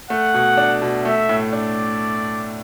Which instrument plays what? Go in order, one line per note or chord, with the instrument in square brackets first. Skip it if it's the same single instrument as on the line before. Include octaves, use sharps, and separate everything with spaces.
[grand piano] A3 [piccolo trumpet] F#5
[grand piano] B2
D4
B2
[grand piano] A3 [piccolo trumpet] E5
[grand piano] A2
[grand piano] D4 [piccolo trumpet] D5